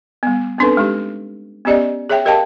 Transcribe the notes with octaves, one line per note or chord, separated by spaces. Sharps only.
G3 B3
B3 C4 D4 D#4 A4 B4
G#3 D#4 G4
B3 C#4 G4 D5 D#5
G#4 C#5 E5 G5
G4 A#4 D#5 F5 G5 A5